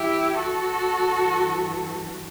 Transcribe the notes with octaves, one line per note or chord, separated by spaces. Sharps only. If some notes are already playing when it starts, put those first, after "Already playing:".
Already playing: G2 E3 E4 G4
F#4 A4
G2
E3